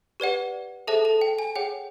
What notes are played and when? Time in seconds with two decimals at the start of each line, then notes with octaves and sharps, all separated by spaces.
0.20 G4 B4 D5 F#5
0.87 G#4 A4 C5 E5 A5
1.05 A4 A5
1.21 G5
1.39 G#5
1.56 G#4 C#5 F#5 G5